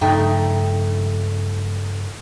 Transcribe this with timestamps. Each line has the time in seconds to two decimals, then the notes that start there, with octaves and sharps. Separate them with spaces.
0.01 G2 C#3 F3 A3 D#4 G5